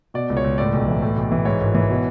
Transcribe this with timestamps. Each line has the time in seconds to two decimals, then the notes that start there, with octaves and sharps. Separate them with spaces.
0.14 B2 D5
0.30 C#2
0.37 C#5
0.44 C#2
0.58 A2 D5
0.73 B1
0.88 E3
1.02 A2
1.16 B1
1.32 E3
1.45 G#2 C#5
1.61 G#1
1.75 E3
1.89 B2